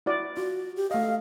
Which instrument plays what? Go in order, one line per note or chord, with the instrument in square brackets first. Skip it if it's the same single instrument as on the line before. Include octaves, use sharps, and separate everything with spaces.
[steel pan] E4 F#4 D5
[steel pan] F4 [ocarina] F#4
[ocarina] G4
[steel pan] A3 D#5 [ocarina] F5